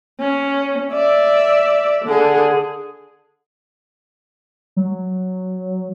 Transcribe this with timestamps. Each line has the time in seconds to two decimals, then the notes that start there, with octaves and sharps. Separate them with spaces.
0.20 C#4
0.92 D5 E5
2.05 D3 G#4
4.76 F#3